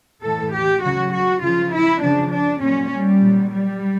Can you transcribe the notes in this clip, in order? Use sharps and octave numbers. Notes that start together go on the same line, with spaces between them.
A2 E3 A4
G4
C#3 F#3 F#4
F#4
C#3 F3 F4
E4
C#3 F3 D4
D4
A#2 F#3 C#4
G3
A#2 F#3
G3